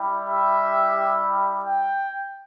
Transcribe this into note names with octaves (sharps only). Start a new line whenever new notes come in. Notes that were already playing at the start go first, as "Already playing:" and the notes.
Already playing: G3 E4 G4
E5
G5